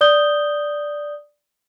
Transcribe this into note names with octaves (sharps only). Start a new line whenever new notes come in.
D5 D#6 G6 G7